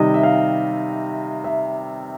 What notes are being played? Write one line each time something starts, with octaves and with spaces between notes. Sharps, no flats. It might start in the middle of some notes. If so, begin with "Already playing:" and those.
Already playing: C3 D#3 G3 D#5
E5
F5
E5